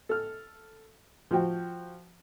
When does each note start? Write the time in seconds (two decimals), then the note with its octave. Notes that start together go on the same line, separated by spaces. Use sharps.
0.09 A4 F6
1.31 F3 F#4 G5